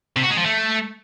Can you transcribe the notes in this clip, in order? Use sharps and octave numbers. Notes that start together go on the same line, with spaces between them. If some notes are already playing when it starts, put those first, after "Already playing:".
C3
F#4
G#3
F3
A3